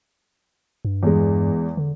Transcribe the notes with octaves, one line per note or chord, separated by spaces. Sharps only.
G2
E2 G#3
D3